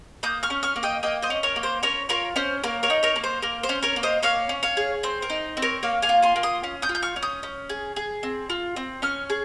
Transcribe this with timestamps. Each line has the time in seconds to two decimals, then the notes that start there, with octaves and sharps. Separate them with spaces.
0.23 A#3 D#6 G6
0.43 C#6 F6
0.50 C#4
0.63 C#6 F6
0.76 A#3
0.83 D#5 G5
1.03 A#3 D#5 G5
1.22 C5 D#5
1.30 C#4
1.43 A#4 C#5
1.56 A#3
1.63 C5
1.83 C#4 A#4 C#5
2.09 F4 A#4 C#5
2.36 C#4 C5
2.64 A#3 A#4 C#5
2.83 A#4 C#5
2.90 D#4
3.03 A#4 C#5
3.16 A#3
3.24 C5
3.42 A#3 A#4
3.63 C5
3.69 C#4
3.83 A#4 C#5
3.96 A#3
4.03 C5 D#5
4.23 A#3 C#5 F5
4.49 C#4
4.63 C#5 F5
4.77 G#4
5.03 C4 C5
5.22 A#4
5.30 D#4
5.57 C4
5.62 A#4 C#5
5.83 A#3 C#5 F5
6.02 F5 G#5
6.09 F4
6.23 G#5 C6
6.36 A#3
6.43 C6 D#6
6.63 C#4
6.82 D#6 G6
6.89 F4
6.95 G6
7.03 C#6 F6
7.16 C#4
7.23 D#6 G6
7.43 C#4
7.69 G#4
7.96 G#4
8.23 C4
8.50 F4
8.76 C4
9.02 C#4 C#6 F6
9.30 G#4